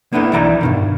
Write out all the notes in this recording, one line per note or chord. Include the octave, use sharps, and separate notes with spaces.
A#3 B3 D4 E4 A4
B1 E3 E4 D5 E5 A#5
G2 B2 D#3